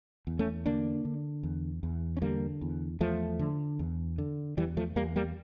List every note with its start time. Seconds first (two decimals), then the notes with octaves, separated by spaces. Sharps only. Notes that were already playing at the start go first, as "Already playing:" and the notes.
0.27 E2
0.39 A3 C#4
0.66 D3 A#3 D4
1.05 D3
1.43 E2
1.83 E2
2.17 C#4
2.22 D3 G3 A#3
2.61 E2
3.00 E2 F3 A3
3.39 D3
3.79 E2
4.18 D3
4.57 E2 E3 G3
4.77 F3 A3
4.96 E2 G3 A#3
5.16 G3 A#3